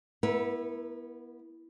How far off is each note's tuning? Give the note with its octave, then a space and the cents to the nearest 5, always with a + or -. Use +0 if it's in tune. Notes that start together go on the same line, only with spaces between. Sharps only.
B3 -20 E4 +0 A#4 +20